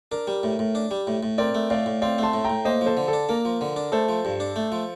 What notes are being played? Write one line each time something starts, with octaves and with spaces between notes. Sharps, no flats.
D4 A#4
G3
A2
A2
D4
G3
A2
A2
C4 A#4 D5
A3
A2 D5 F5
A2
C4 D5 F5
A3 A5 C6
A2
G5 A#5
A2
A#3 C5 D#5
F3
A4 C5
D3
A4
D4
A#3 A#4
F3
D3
D4
A3 A4 C5
F3
G2
D4
A3
F3